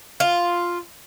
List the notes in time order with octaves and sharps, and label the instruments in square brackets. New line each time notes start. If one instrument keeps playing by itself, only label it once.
[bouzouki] F4